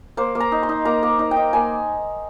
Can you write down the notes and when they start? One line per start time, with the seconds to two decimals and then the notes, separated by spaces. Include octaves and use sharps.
0.17 A#3 C5
0.35 A#3
0.40 A#5
0.52 D#4
0.63 C6
0.69 D#4
0.85 A#3 A#5
1.03 A#3
1.19 D#4
1.31 G5
1.36 D#4
1.53 A#3 G#5